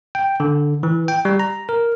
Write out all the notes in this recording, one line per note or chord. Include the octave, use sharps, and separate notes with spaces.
G5
D3
E3
G5
G3
A#5
A#4